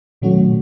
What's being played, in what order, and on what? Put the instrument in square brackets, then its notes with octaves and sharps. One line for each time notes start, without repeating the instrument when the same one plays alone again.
[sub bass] A#2 [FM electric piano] D#3 F#3 A3 C#4 F#4
[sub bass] B2
A#2